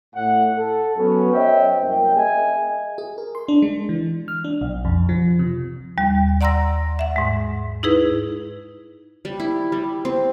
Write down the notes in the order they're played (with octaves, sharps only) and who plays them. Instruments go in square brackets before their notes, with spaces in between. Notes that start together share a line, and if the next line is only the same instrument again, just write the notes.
[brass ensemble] A2 F#5
A4
F#3 B3 C#4
C5 C#5 D#5 E5 G5
C2 F#2 A#3 G5
G#4 D#5 E5 G#5
[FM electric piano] G#4
A#4
C6
D4
G#3
E3
F6
D4
B1
F2
F3
C3
[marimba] D#2 G3
D5 F#5 A#5 C6 E6 A#6
E5 F#5
G#2 G#3
D#4 E4 G#4 B4
[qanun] G3
E4
G3
C4